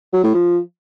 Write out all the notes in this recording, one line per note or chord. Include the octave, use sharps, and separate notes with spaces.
F#3
A2
F3